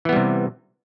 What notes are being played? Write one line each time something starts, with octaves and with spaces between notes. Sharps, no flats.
C3 E3 G3 B3